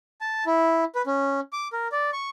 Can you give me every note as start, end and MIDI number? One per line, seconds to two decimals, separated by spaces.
0.21 0.44 81
0.46 0.84 64
0.95 1.02 71
1.06 1.40 61
1.52 1.68 86
1.73 1.88 70
1.92 2.10 74
2.13 2.30 85